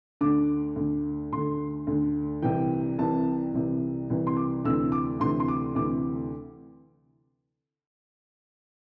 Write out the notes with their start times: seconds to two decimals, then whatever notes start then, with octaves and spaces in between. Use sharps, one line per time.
0.21 D2 D3 D6
0.76 D2 D3
1.32 D2 D3 C6
1.87 D2 D3
2.42 C2 C3 E3 G5
2.98 C2 C3 E3 A5
3.53 C2 C3 E3
4.10 C2 C3 E3
4.27 C6
4.37 D6
4.65 D2 C3 E3 E6
4.92 D6
5.20 D2 C3 E3 C6
5.40 C6
5.48 D6
5.75 D2 C3 E3 D6